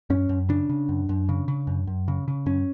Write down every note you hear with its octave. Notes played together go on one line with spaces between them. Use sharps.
F#2 C#4
F#2
C#3 D4
C#3
F#2
F#2
C#3
C#3
F#2
F#2
C#3
C#3
F#2 C#4